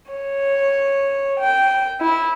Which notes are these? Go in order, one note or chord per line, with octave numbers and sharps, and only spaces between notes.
C#5
G5
E4